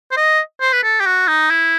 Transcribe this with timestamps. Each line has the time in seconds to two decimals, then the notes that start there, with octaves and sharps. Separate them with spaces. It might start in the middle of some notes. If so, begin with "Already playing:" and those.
0.11 C5
0.17 D#5
0.61 C5
0.73 B4
0.83 A4
1.00 G4
1.06 F#4
1.28 D#4
1.50 E4